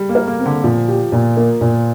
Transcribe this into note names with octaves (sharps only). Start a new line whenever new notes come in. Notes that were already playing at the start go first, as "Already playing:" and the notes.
Already playing: G3
A#3
A#4
A#3
C4
D3
A#2 F3
G4
A#2
A#3
A#2